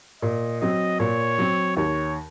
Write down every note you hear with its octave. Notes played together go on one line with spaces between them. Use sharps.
A#2 D#5
F#3 C4 D#5
A#2 C#5
F#3 C4
D#2 C#5